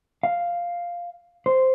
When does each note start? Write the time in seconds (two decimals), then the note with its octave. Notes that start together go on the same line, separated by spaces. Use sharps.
0.23 F5
1.46 C5